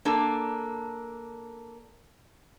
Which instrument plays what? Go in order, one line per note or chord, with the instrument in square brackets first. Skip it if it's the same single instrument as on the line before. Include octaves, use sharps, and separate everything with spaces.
[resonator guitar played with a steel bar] A#3 D4 A4